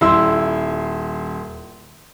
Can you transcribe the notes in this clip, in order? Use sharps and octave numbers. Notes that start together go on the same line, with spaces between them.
D#1 E4 C6 E6